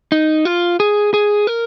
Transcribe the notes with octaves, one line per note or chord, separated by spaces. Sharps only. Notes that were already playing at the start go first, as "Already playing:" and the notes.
D#4
F4
G#4
G#4
A#4